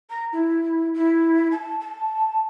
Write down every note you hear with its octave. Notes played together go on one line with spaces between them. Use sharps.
A#5
E4
E4
A5
A5